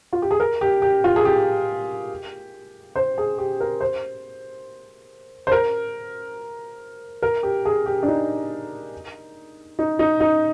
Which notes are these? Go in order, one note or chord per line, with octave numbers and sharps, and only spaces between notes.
F4
G4
G#4
A#4
G4
G4
F4
G#4
G4
C5
G#4
G4
A#4
C5
C5
A#4
A#4
G4
G#4
G4
D4
D#4
D#4
D#4
D#4